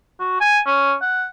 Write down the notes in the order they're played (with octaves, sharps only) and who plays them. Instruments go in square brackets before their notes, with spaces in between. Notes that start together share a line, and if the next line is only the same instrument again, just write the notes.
[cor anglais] F#4
G#5
C#4
F#5